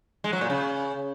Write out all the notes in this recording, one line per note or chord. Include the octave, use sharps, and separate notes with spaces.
G#3
F#3
A#2
C#3